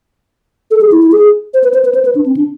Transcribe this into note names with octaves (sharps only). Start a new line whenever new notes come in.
A4
G#4
E4
E4
G#4
C5
B4
C5
B4
C5
B4
D4
C4
D4